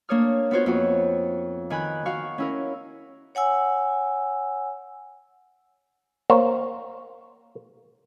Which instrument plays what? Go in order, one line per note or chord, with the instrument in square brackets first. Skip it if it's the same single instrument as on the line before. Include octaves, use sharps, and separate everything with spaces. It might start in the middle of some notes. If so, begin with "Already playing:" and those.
[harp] A#3 D4 C#5 D#6 F6
B3 D#4 F4 F#4 C5 C#5
F2 F#4
D#3 G#5 B5 F#6
D#3 F#4 F5 C#6
C#4 E4 A#4
[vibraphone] C#5 F#5 G#5 E6
[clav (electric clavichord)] A#3 C5 C#5